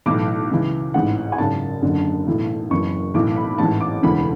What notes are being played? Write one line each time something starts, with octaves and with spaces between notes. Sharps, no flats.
B1 A2 E3 D6
C#2 C#3 E3
A1 G#2 E3 F#5
G#5
G#1 F#2 C#3 A5
F#1 F#2 D3
B1 A2 E3
F#1 F#2 E3 C#6
B1 A2 E3 D6
B5
A1 G#2 E3 A5
D6
E1 D2 C#3 E3 B5